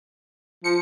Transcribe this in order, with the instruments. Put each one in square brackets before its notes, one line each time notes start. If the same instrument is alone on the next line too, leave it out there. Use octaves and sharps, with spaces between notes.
[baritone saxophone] F3 [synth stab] C#7